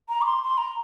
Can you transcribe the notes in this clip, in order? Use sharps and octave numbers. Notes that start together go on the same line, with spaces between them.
A#5
D6
C6
C6
A#5